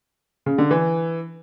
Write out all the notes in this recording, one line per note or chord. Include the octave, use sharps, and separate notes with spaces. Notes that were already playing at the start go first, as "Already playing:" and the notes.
C#3
D3
E3